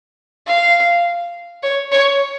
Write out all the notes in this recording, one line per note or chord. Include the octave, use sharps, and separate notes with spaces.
F5
C#5
C#5